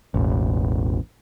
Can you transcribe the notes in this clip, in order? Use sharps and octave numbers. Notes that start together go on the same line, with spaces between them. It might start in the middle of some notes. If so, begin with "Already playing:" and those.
E1 A1